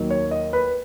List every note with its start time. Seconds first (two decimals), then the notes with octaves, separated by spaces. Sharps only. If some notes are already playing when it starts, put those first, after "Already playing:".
Already playing: D#2 D#3 F#3
0.11 C#5
0.31 D#5
0.53 B4